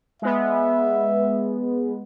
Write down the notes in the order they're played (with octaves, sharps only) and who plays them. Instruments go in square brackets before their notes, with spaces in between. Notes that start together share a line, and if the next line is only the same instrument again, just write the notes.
[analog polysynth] G#3 B3 [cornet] E5